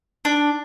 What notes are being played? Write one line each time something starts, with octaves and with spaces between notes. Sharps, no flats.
D4